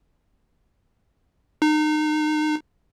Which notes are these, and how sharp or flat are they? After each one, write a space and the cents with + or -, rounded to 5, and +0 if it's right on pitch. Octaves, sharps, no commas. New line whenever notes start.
D#4 -30